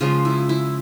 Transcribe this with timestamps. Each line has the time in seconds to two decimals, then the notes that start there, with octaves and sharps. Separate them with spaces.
0.01 C#3 F3 G#3 F4
0.25 E4
0.49 E4